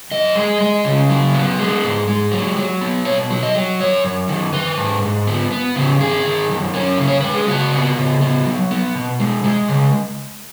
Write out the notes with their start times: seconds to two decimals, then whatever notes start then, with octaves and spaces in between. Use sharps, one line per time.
0.11 F#2 D#5
0.35 G#3
0.61 G#3
0.85 C#3
1.09 F#3
1.34 B3
1.59 G#3
1.84 G#2
2.07 G#3
2.32 F#3
2.56 F#3
2.81 B3
3.05 B2 C#5
3.30 F#3
3.43 D#5
3.55 F#3
3.80 F#2 C#5
4.04 F#2
4.28 D#3
4.53 D#3 B4
4.77 G#2
5.03 G#2
5.27 B3
5.51 B3
5.76 C#3
6.00 D#3 G#4
6.25 D#3
6.49 F#2
6.74 C#4
6.98 C#3
7.07 C#5
7.21 G#3 B4
7.34 G#4
7.48 C#3 F#4
7.72 B3
7.97 C#3
8.21 B3
8.45 F#3
8.71 B3
8.95 B2
9.19 G#3
9.44 G#3
9.69 C#3